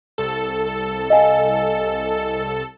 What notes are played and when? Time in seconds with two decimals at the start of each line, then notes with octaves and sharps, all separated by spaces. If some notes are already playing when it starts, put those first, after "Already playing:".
0.18 C2 A4
1.10 D#5 F5 G#5